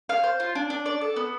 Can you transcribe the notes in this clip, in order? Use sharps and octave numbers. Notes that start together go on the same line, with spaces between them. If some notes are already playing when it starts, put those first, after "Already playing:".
F5
C5
F4
D4
D4
D5
A4
B3